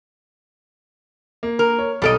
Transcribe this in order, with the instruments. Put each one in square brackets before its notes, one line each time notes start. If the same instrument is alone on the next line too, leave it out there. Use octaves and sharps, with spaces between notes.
[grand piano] A#3
[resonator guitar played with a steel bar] A#4
[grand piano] C#5
[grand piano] B1 F6 D7 [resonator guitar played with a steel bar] G3 A4 D#5